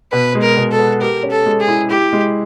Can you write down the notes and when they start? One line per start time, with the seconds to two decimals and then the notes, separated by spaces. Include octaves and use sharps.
0.12 B2 B4
0.35 G#3
0.42 A#4
0.57 B2
0.72 A4
0.79 B3
1.01 G4 A#4
1.23 C#4
1.31 A4
1.46 G#3
1.61 G#4
1.68 E4
1.91 E4 G4
2.13 G#3